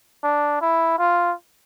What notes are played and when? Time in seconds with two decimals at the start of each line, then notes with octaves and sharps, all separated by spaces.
0.24 D4
0.62 E4
0.99 F4